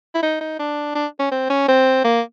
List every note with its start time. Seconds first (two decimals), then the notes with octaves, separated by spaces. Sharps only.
0.15 E4
0.23 D#4
0.41 D#4
0.59 D4
0.95 D4
1.20 C#4
1.32 C4
1.50 C#4
1.68 C4
2.04 A#3